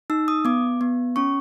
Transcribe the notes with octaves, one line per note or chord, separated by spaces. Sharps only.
D#4 E6
D#6
B3 D6
B3
C#4 C#6